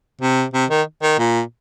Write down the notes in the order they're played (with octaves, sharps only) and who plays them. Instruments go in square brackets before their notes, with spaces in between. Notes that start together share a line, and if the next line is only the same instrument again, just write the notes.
[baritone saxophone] C3
C3
D#3
D#3
A#2